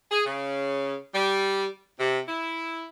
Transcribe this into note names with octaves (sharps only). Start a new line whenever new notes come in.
G#4
C#3
G3
C3
E4